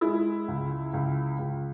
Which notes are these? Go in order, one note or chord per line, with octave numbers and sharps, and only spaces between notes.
G#3 E4
C#2
C#2
C#2